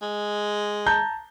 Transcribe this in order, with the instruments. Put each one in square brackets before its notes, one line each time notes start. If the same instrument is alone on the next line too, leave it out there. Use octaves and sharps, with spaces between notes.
[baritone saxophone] G#3
[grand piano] A5 A#5 G6